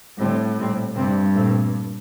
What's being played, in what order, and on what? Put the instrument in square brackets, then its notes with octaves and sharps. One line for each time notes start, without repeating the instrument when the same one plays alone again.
[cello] A2 [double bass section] D3 G3 C4
[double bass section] A#2 G3 C4
[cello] G2 [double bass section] C3 G3 C4
[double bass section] A#2 A3 C4